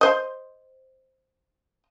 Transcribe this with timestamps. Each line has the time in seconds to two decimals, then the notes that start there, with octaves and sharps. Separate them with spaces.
0.01 C5 D#5